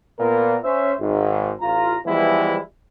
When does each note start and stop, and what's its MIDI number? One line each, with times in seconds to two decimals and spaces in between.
0.19 0.56 46
0.19 0.56 59
0.19 0.56 70
0.64 0.93 61
0.64 0.93 72
0.64 0.93 76
1.00 1.51 32
1.00 1.51 44
1.61 1.96 33
1.61 1.96 65
1.61 1.96 82
2.06 2.57 52
2.06 2.57 53
2.06 2.57 55
2.06 2.57 56
2.06 2.57 59
2.06 2.57 64